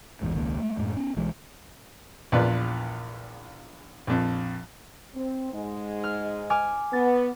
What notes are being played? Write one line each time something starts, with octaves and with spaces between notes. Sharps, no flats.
D1 A1 E2 G#2
E1 C#2 D#3 A#3
G#3 A3
F#2 A2 G#3
B3 C#4
B1 E3 G#3
A#1 E2 F4 B4 D5
A#1 F2
C4
G#2 G#3
F6
G#5 D6 F6
B3 A6